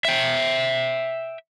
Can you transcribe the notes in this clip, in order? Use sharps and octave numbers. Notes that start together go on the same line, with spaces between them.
E5 G5